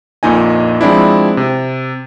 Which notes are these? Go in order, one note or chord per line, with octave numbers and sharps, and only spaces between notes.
A#1 F2 A#2 D#4 D#5 G#5
F3 G#3 C4 D4 E4
C3